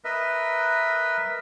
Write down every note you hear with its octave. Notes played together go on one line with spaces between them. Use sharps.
A#4 B4 D#5 E5